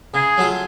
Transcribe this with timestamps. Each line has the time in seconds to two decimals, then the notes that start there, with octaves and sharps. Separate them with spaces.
0.14 C#3 G#4
0.38 F#3 A3 F4